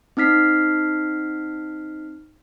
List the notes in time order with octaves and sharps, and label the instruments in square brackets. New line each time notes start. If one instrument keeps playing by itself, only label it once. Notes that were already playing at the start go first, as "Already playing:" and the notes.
[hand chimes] C4 D#4 F6 B6 C7